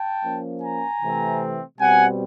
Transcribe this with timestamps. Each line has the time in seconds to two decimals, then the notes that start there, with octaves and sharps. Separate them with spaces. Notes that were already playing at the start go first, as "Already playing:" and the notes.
Already playing: G5 A5
0.23 F3 A#3 C#4
0.62 G#5 A#5
1.01 C3 E3 A3 C4
1.78 B2 G3 C4 F#5 G#5